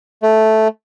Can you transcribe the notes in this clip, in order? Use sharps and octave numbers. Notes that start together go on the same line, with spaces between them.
A3